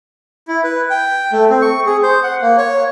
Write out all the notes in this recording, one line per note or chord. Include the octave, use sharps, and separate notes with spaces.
E4
B4
G5
A3
C4
C#6
G#4
C5
F#5
A#3
C#5